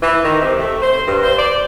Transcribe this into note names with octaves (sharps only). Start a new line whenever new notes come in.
E3
D#3
C3
A3
C5
G2
C5
D5